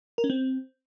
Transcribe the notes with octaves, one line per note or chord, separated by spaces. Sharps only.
A#4
C#4
C4